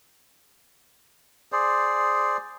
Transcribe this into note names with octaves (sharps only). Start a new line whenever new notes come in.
G#4 C5 D5